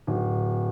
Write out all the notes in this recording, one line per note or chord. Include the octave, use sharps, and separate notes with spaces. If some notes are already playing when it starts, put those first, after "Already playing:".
D1